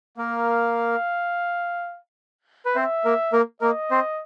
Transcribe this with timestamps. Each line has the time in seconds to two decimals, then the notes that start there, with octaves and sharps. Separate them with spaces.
0.17 A#3 A#4 F5
2.66 B4
2.75 C4 C5 E5
3.05 A#3 A#4
3.33 A#3 A#4
3.61 A#3 A#4 D#5
3.91 C4 C5